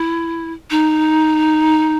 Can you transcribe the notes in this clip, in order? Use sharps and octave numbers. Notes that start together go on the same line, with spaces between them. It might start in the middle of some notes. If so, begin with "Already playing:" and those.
Already playing: E4
D#4